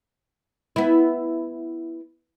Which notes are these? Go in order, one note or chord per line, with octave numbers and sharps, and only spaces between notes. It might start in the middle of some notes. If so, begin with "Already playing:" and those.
B3 E4